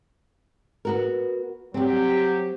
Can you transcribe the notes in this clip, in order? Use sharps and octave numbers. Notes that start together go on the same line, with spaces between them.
B3 F#4 A#4
F#3 G3 C4 G4